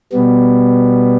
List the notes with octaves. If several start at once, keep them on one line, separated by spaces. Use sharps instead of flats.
B2 G3 B3